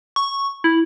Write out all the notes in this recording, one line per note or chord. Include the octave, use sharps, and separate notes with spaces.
C#6
E4